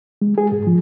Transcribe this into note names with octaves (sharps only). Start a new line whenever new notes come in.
G#3
G#4
G#2
F3